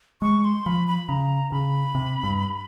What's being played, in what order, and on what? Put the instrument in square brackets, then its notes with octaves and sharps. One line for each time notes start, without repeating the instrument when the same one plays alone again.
[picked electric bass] G#3 [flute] C#6
[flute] C6
[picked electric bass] F3 [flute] B5
[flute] B5
[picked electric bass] C#3 [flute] A#5
[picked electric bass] C#3 [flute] B5
[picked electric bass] C3
G2